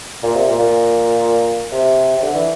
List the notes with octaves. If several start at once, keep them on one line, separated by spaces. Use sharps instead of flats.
A#2
C3
A#2
A#2
C3
C3
D3
E3